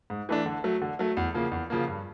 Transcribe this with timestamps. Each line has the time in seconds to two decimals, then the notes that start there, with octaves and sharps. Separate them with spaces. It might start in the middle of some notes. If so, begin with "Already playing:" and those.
0.10 G#2
0.29 E3 A3 D4
0.46 D3
0.64 F#3 A3
0.82 D3
0.99 F#3 A3
1.17 E2
1.34 C#3 F3 A#3
1.52 E2
1.70 C#3 F3 A#3
1.87 G2